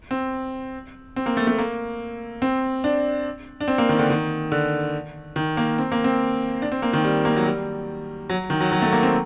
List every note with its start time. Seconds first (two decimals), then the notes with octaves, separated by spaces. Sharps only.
0.11 C4
1.16 C4
1.26 A#3
1.37 A3
1.47 A3
1.58 A#3
2.42 C4
2.84 D4
3.61 D4
3.68 C4
3.78 A#3
3.89 D#3
3.99 D3
4.10 D#3
4.52 D3
5.36 D#3
5.57 A#3
5.78 C4
5.92 A#3
6.04 C4
6.62 D4
6.72 C4
6.82 A#3
6.93 D#3
7.04 G3
7.25 A#3
7.36 F#3
7.45 G3
8.30 F#3
8.50 D#3
8.61 F#3
8.72 F#3
8.82 A3
8.93 A#3
9.03 C4